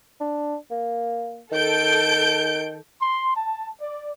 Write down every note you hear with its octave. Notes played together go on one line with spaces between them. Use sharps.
D4
A#3
D#3 A4 G6 D7
C6
A5
D5